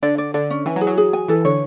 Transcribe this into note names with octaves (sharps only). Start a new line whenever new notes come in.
D3 D5
D5
D3 D5
C#4
E3 G#5
F#3
G#4
F#3
G#4
G#5
E3 A4
D3 C#5